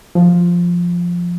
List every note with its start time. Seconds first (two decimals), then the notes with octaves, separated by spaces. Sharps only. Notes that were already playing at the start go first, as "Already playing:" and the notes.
0.15 F3